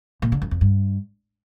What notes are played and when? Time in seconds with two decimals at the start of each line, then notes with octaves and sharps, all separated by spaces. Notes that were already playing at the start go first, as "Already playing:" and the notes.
0.22 A#2
0.32 D3
0.42 F#2
0.51 F2
0.61 G2